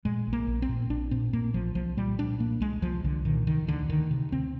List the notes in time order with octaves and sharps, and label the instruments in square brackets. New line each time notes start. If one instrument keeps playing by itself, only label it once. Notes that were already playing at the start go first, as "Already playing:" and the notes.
[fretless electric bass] A#2 G#3
A#1
A#3
A#1
C4
A#2
A#1 D4
A#2 C4
A#2 A#3
A#1 F3
C2 F3
A#2 G3
A#2 D4
A#2 A#3
C2 G#3
C2 F3
C2 D3
A#2 D#3
C3 D#3
D2 D3
D2 D#3
C3
D2 C4